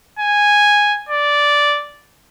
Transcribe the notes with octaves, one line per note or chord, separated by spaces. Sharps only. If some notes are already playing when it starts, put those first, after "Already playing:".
G#5
D5